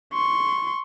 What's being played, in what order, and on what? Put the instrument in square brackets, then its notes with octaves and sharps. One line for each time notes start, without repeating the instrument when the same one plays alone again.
[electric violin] C6 C#6